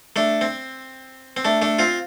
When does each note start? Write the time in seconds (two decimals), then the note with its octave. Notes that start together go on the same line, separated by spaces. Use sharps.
0.16 A3 D4
0.41 C4
1.37 C4
1.45 A3 D4
1.62 A3 D4
1.79 C4 F4